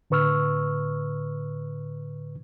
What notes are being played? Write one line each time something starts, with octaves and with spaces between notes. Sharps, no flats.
A2 D3 B4 C#6 E6 F6